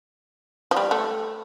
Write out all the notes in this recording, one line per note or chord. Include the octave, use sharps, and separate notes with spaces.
F3
G3
A3